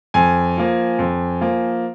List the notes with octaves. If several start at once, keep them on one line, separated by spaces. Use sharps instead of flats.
F2 G#5
F3 A#3
F2
F3 A#3